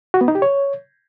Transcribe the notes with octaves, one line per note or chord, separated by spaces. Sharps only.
F#4
B3
D#4
G4
C#5